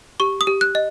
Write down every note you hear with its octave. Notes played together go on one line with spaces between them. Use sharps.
G4 C#6
D#6
G4
F#6
D#5